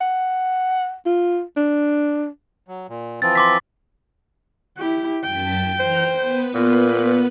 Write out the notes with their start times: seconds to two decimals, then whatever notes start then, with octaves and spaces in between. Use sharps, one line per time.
0.01 F#5
1.06 F4
1.57 D4
2.68 F#3
2.89 A#2
3.22 E3 F3 C4 A6
3.35 C6 D6 B6
4.78 E4 G4
5.24 F#2 G5 A5 B6
5.80 E3 C5 A#5 F6
6.12 B3 B4
6.54 A#2 F4 A#4